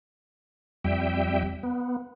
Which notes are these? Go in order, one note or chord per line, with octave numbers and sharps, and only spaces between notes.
F2 G3 E5 G5
B3